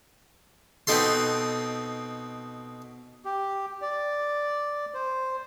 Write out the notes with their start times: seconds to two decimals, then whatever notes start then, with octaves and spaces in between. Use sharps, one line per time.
0.87 B2 C4 D#4 A4 C6
3.24 G4
3.82 D5
4.94 C5